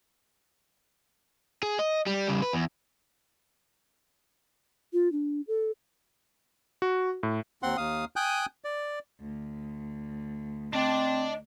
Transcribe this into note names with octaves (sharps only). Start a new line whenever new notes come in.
G#4
D#5
G3
C#3 G3
B4
E2
F4
D4
A4
F#4
A2
D#2 C4 F#5 C6
D#2 F5 D#6
G5 G#5 D#6 F#6 G6
D5
D2
C4 D4 D5 D#5